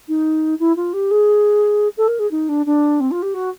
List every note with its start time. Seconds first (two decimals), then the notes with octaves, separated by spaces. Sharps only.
0.08 D#4
0.59 E4
0.76 F4
0.93 G4
1.11 G#4
1.97 A4
2.08 A#4
2.19 G#4
2.31 D#4
2.49 D4
2.66 D4
3.00 C4
3.11 F4
3.22 G4
3.34 F#4